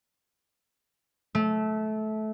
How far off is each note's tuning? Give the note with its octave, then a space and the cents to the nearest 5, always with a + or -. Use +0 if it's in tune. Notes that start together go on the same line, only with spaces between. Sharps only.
A3 -20